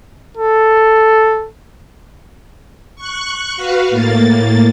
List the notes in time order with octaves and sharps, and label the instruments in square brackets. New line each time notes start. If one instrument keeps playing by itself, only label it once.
[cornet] A4
[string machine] C#6 F#6
F#4 B4 F5
A2 A#3 A6